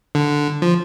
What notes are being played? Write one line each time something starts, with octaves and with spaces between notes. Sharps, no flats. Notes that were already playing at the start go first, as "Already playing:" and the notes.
D3
F3